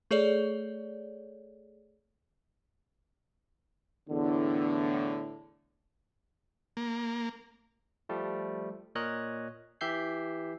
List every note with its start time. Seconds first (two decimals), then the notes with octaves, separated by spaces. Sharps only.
0.11 A3 G#4 A4 C#5 D5
4.09 E2 A2 D3
6.77 A#3
8.09 F3 G3 A3
8.95 A#2 A#4 C#5 D#5 F#6
9.81 E3 G4 E5 G6 C7